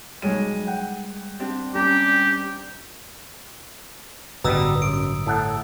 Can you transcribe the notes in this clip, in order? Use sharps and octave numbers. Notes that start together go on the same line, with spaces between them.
B1 G3 G#3 G#4 C#5 D#7
F#5 G5
C4 D4 G4
G3 C#4 G4 A#5
A1 G2 B2 D3 G3 A#5 D#6 E6
F#2 D7
A2 A4 F#5